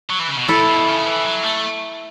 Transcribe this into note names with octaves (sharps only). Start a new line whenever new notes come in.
F#3
E3
C#3
B2
A2 E4 A4
B2
C#3
E3
F#3
A3